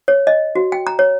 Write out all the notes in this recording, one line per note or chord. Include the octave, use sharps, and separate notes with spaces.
C#5
D#5
F#4
G5
A#5
C#5